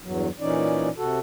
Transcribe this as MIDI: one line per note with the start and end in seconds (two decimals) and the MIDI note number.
0.01 0.28 40
0.01 0.28 43
0.01 0.28 54
0.40 0.89 46
0.40 0.89 52
0.40 0.89 61
0.40 0.89 63
0.40 0.89 74
0.97 1.19 48
0.97 1.19 66
0.97 1.19 69